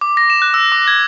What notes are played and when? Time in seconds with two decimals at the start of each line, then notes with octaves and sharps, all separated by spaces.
0.01 D6
0.17 A#6
0.30 E7
0.42 F#6
0.54 E6
0.72 D6
0.87 G#6